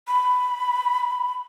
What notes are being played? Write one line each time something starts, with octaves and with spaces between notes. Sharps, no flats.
B5